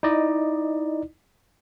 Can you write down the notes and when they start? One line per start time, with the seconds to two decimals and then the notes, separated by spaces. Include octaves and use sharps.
0.03 D#4 E4 D5 D#5